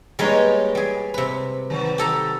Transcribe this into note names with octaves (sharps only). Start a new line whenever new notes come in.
G3 G#3 A#3 B3 D#4 C#5
G3 G#4
C3 B4
D#3 F#3 G3
G4 A4 A#5